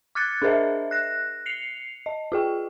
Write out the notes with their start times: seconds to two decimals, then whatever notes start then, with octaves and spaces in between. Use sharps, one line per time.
0.15 D6 F6 F#6 G#6 A6 C#7
0.42 D4 G#4 A#4 C5 D#5 E5
0.91 F#6 A#6
1.46 C7 C#7 F7
2.06 D#5
2.32 F4 G#4 G5